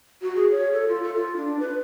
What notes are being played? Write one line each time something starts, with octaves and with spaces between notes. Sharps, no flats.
F#4
G#4
C#5
A4
F4
A4
F4
D4
B4